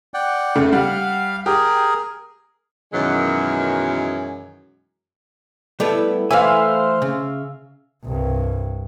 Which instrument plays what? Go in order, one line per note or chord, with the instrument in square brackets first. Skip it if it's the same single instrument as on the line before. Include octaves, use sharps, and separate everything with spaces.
[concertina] D5 F#5 G5
[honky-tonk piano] F1 C#3 A3
[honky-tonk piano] G3 F#5 [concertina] F5
[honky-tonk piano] G4 [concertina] G#4 A#4
[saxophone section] F#2 B2 D#3 E3 F#3 G#3
[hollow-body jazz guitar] G3 A3 [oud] B3 E4 A4
[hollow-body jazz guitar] E3 G#5 [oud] A3 B4 [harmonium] C5 [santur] E5 F5
[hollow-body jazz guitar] C#3
[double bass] C2 G2